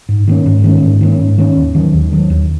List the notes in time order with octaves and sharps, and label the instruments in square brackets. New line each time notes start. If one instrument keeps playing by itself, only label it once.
[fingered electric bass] G#2
D#3 A#3 C#4
G#2
D#3 A#3 C#4
G#2
D#3 A#3 C#4
G#2
D#3 A#3 C#4
D#2
D#3 F#3
D#2
D#3 F#3
D#2